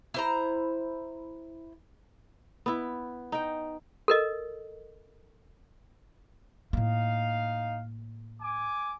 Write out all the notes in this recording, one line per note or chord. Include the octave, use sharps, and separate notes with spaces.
E4 C5 A#5
B3 E4
D#4 G5
A4 A#4 D#5
A2 A#3 D#4 F5
G#5 D6